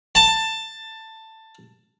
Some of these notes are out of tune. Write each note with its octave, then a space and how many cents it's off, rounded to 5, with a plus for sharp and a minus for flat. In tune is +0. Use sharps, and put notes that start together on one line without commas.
A5 +15